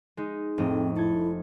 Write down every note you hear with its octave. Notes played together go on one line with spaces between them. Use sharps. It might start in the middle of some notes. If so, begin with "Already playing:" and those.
G#3 D#4
F1 A2 C4 D#5
E4 A4 G#6